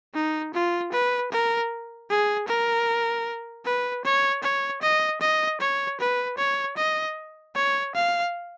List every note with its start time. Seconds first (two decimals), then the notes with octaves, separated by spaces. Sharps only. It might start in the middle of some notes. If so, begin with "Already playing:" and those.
0.14 D#4
0.54 F4
0.92 B4
1.31 A#4
2.10 G#4
2.48 A#4
3.65 B4
4.04 C#5
4.43 C#5
4.82 D#5
5.21 D#5
5.60 C#5
6.00 B4
6.38 C#5
6.77 D#5
7.55 C#5
7.95 F5